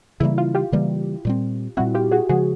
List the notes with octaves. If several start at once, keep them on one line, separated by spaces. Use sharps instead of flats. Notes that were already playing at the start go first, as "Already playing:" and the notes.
C#3 E3 G3 A#3 E4
F4
F4 G4
C#3 E3 G3 A#3
A#2 G3 C4
A#2 G3 C4 E4 F#4
F4 G4
F#4 G#4
C#3 F3 G#3 F#4 G#4